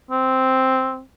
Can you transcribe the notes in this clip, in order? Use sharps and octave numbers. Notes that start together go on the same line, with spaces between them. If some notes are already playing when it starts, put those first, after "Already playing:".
C4